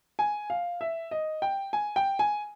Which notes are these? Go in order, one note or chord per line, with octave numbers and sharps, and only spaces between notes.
G#5
F5
E5
D#5
G5
G#5
G5
G#5